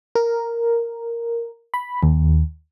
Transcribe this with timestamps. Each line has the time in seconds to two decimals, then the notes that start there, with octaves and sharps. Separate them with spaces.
0.15 A#4
1.74 B5
2.03 D#2